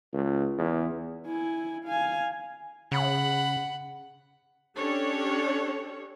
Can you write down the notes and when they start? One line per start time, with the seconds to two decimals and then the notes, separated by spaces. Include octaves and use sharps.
0.13 C#2
0.58 E2
1.27 E4 G#5
1.85 F5 G#5
2.92 C#3 F#5 B5
4.77 C#4 D4 G4 A4 C#5